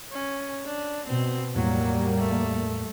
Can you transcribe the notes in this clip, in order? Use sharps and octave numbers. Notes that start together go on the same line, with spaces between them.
C#4
D4
B2 C4
E2 A2 F#3 G3 A#3
A3